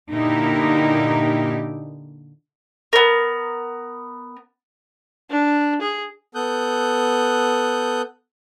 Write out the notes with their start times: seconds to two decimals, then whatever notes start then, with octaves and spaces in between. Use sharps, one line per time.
0.11 A#2 D3 D#4 E4 G4 A#4
2.93 B3 A#4
5.30 D4
5.82 G#4
6.35 B3 A4 D#6 F#6 G6